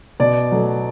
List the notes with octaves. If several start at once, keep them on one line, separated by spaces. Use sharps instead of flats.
B2 D5
F#3 A3